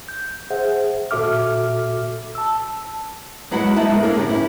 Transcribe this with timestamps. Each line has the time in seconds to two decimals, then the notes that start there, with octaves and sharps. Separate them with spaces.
0.09 G6
0.50 G#4 C5 E5 F#5
1.11 A#2 F#4 A4 E5 D6 F6
2.35 A5 E6
3.51 F#3 G#3 B3 E4 F#4 F#5
3.76 G#3 B3 D#4 E4 F#5 A5
3.92 D3 G#4 A#4
4.03 A#3 D4 A4 A#4 C#5 F5
4.15 F#2 D3 C#4 G4
4.29 B3 C#4 E4